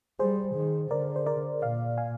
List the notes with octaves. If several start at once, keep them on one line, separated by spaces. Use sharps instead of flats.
G3 G#4 C5
D#3
D3 A#4 D5
C5
A#4 D5
A#2 D5 F5
F5 G#5